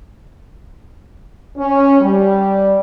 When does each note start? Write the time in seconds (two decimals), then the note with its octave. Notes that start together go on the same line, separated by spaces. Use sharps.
1.58 C#4
2.01 G3